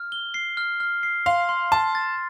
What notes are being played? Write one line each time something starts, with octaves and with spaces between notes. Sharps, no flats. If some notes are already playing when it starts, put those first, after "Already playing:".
Already playing: F6
G7
C7
F6
F6
C7
F5 C6
C6
A5 C6
A6